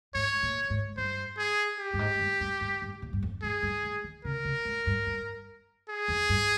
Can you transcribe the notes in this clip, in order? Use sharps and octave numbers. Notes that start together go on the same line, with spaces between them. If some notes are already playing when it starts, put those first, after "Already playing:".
G#2 C#5
A#2
G#2
G2 C5
G#4
G4
G2
G#2
G2
G2
G2
G2
A#2
G2
F2
G#2 G#4
G2
G#2
D#3
C#3 A#4
C3
G#2
G2
G2
G#4
F2
G2